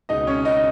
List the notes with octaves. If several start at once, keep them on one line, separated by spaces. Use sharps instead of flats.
C#2 B2 D#4 D#5
C#4 C#5
D#4 D#5